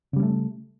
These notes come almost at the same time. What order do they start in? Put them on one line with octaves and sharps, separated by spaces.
C#3 G3 C#4 A3